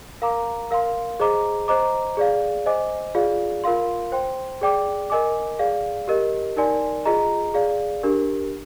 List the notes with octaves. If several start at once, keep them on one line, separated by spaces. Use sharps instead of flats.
A#4 F5 A#5 D6
A#4 F5 C6
G#4 C5 D#5 A#5 D6
C5 D#5 A#5 D6
G#4 D5 F5
C5 D#5 G#5 D6
F4 G#4 D5 F5
F4 A#4 F5 C6
C5 G5 C6
G#4 D5 G5 D6
A#4 D#5 G#5 D6
G#4 D5 F5
G4 A#4 D#5
D#4 A#4 D5 G#5 C6
F4 G#4 D#5 A#5
G#4 D5 F5
D4 G4 A#4